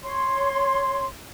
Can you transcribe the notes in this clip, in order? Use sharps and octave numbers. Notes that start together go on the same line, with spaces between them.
C#5 C6